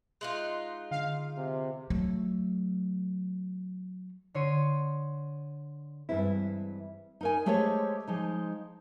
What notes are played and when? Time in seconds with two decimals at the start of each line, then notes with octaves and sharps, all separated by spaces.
0.21 G#3 D#4 F4 F#6
0.91 D3 F5
1.37 C3
1.90 F#3 A3
4.34 D3 C#5 C6 D#7
6.09 G2 E3 G#3 C4 E4
7.21 D#4 A#4 G#5
7.46 G#3 A3 G4 G#4 C5 C#5
8.08 F3 G#3 D#4